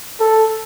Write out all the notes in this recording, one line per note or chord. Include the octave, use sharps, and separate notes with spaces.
A4